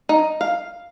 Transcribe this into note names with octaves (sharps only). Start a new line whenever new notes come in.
D#4
F5